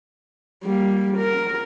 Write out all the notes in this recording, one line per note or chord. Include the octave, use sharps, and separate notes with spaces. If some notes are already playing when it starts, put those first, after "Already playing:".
G3 A#3
A#4